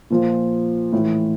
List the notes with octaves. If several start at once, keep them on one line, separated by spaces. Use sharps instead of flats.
A#2 F3
A2 E3